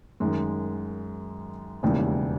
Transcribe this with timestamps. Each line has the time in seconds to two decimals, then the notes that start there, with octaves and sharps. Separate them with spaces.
0.20 F#2 D#3 G#3
1.83 E1 D#2 C#3 E3 G3